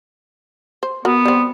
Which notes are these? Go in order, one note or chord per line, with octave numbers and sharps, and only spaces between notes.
C5
B3 F#4 A#4
G3 C4